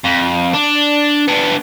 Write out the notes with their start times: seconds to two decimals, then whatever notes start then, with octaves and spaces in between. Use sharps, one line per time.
0.05 F2
0.54 D4
1.28 B3 D4